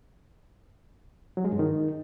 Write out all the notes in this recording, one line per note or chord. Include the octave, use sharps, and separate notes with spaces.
F#3
G#3
G2
D#3